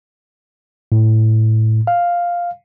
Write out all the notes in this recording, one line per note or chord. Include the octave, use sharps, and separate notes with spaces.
A2
F5